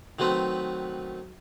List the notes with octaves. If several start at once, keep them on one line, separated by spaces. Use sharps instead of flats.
D#3 F#3 A3 C4 B4